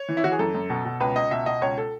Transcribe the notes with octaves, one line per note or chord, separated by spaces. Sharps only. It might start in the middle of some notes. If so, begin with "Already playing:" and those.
Already playing: C#5
E3
E4
E3 F#4
G#4
F#2 A4
F#2
B2
B2
C#2 B4
C#2 D#5
B2 E5
B2 D#5
C#2 C#5
A4